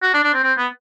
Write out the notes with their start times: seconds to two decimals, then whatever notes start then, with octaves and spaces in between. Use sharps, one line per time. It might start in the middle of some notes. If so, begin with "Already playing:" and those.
0.03 F#4
0.14 D4
0.24 D4
0.33 C4
0.43 C4
0.58 B3